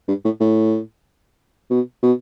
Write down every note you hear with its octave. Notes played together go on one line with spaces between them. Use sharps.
G2
A2
A2
B2
B2